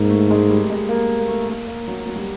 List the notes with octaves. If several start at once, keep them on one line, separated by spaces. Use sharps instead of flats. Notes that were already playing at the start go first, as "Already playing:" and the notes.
Already playing: G#2 A#3
A3
G#3
G3
G#3
A#3
A#3
A3
A#3
A#3
F#3
F#3
G3